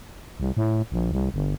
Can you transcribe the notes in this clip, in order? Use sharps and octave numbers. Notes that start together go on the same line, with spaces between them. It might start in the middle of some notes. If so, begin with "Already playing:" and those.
C2
A2
A#1
C2
G1